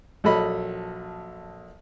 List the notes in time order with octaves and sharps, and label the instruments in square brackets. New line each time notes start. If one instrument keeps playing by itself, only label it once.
[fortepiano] A#1 F#3 A4 D#5 B5